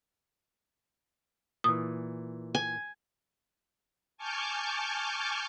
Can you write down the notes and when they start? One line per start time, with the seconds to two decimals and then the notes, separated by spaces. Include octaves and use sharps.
1.64 A#2 E3 D#6
2.55 G#5
4.17 G#5 A5 C#6 D6 F6 G6